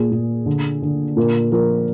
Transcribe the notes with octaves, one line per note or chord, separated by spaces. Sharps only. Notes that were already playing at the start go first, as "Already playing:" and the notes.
Already playing: A#2 G#4
A#2
D3
D3
A#2 A#4
F3 A#4